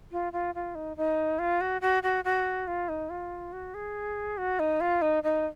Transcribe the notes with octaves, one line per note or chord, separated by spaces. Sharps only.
F4
F4
F4
D#4
D#4
F4
F#4
F#4
F#4
F#4
F4
D#4
F4
F#4
G#4
F#4
D#4
F4
D#4
D#4